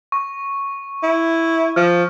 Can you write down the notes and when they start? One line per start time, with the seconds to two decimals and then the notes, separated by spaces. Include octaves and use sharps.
0.12 C#6
1.03 E4
1.76 F3 F6